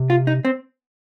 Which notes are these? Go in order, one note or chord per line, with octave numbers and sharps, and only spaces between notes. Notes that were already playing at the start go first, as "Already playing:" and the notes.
Already playing: C3
F4
D#4
C4